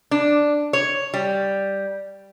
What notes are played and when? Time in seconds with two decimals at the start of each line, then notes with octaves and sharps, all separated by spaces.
0.11 D4
0.73 C#5
1.14 G3